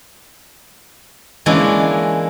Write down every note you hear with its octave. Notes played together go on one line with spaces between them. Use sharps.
E3 G#3 A#3 C#4 D4 E4